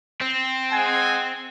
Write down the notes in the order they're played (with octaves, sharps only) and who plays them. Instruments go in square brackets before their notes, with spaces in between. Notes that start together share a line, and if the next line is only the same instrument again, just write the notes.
[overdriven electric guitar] C4
[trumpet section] G#3 F#5 G#5